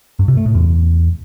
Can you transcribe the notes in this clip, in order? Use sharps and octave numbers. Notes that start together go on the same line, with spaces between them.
G2
C3
A3
A2
E2